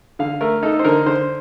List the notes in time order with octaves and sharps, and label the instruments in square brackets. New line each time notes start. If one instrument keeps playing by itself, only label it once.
[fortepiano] D3 F5
A3 A#4
D#4 A4
C5
D3 A#4
D3 C5